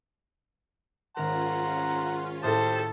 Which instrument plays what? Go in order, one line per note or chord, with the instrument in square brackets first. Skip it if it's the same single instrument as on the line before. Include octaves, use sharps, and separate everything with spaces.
[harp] G#1 A#4 [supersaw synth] C#4 F4 [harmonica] F#5 A#5 C6
[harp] A2 D#6 G#6 [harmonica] G4 C5 [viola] A4